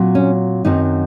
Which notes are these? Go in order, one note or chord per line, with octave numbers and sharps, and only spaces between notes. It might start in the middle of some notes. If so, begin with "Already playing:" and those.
Already playing: A#2 F#3 C4
C#4
F#2 D#3 F#3 C4 D#4